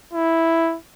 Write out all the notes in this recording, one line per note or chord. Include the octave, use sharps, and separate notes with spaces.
E4